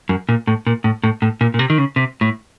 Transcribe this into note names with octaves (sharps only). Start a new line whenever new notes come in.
F#2
A#2
A2
A#2
A2
A2
A2
A#2
A#2
C3
D#3
C#3
C3
A2